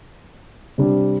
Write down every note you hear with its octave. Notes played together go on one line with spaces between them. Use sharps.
C3 G3 D4